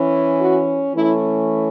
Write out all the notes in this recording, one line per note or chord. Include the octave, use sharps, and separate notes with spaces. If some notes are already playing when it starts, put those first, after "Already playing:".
Already playing: E3 C#4
F#4
E3 A3 C#4 E4